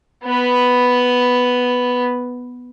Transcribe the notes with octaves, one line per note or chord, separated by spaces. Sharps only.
B3 B4